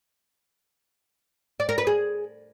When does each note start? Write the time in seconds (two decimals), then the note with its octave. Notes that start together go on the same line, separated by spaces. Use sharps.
1.60 D5
1.69 A#4
1.78 B4
1.87 G#4